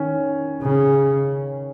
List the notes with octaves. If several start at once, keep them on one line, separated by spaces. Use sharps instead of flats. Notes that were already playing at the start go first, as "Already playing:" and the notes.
Already playing: D#3 C#4
C#3